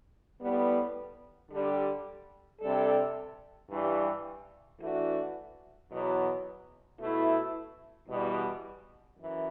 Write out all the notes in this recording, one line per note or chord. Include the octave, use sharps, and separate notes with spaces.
A2 G3 B3
D3 G3 D4 G4
C3 G3 D4 A4
G2 E3 G3
E3 A3 D4 F#4
E2 B2 F#3
B2 A3 E4
E2 B2 G3
F#2 E3